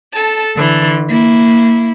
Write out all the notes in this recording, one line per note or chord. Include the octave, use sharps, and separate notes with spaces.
A4 A5
D3 E3
A#3 E4